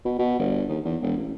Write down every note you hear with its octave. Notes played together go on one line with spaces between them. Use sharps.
B2
B2
G1
D#2
E2
E1
A1